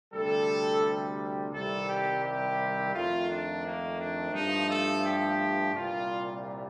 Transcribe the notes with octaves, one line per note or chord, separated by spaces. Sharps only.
D2 C3 G3 A4
C2 C3 D#3 G3 A4
G4
G4
F2 D#3 A3 F4
D4
A#3
D4
G2 F3 A3 D#4
A4
G4
C2 A#2 G3 F4